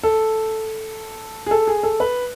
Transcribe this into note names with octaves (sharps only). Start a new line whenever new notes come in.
A4
G#4
A4
G#4
A4
B4